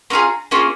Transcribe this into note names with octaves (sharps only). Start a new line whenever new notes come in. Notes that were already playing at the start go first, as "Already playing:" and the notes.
A#3 C#4 F4 G#4 A#5
A#3 C#4 F4 G#4